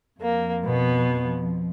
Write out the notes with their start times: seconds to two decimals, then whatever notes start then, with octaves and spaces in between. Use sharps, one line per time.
0.20 F2 F3 A#3
0.65 B2 B3